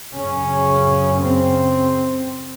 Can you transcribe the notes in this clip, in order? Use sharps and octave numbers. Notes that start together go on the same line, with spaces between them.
F#2 C#3 C#4
C4